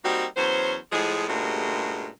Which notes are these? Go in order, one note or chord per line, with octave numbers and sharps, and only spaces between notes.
G3 A#3 C4 D#4 F#4 G4
E2 F#3 C#4 C5
A2 F3 G#3 G#4
G2 A#2 C#3 G#3 A3 F#4